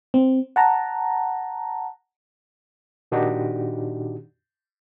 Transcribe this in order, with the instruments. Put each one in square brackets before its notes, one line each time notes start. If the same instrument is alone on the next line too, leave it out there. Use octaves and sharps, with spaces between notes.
[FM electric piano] C4
F#5 A5 A#5
[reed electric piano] A#2 D#3 D4 D#4 F#4 G4